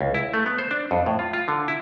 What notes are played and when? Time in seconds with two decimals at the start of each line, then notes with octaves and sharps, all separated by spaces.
0.01 C#2
0.14 E4
0.34 A3
0.46 B3
0.58 C5
0.71 D4
0.91 F2
1.06 A2
1.19 F4
1.33 F4
1.48 D3
1.68 E4